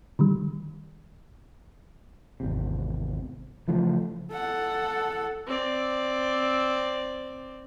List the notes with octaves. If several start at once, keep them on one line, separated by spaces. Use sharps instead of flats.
D3 D#3 G3
G#1 E2 C3
C#3 E3 F3 A3
A4 F#5
C4 D5